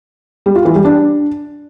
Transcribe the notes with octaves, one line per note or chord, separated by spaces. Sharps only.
G3
F4
E3
G3
D4